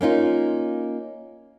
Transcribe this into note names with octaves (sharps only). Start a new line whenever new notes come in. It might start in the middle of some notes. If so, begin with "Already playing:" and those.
A#3 C#4 D#4 F4